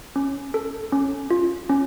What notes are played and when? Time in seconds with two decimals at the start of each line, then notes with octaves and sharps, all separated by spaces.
0.16 C#4
0.54 A4
0.92 C#4
1.30 F4
1.69 C#4